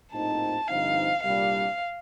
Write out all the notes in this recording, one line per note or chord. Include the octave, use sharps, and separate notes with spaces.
A#1 A2 F3 C4 D#4 A5
G2 D3 F3 C4 D#4 F5
C2 A#2 G3 D4 F5